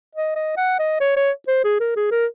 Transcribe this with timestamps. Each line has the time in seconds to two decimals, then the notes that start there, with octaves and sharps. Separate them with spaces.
0.15 D#5
0.36 D#5
0.57 F#5
0.79 D#5
1.00 C#5
1.16 C#5
1.47 C5
1.64 G#4
1.80 A#4
1.96 G#4
2.11 A#4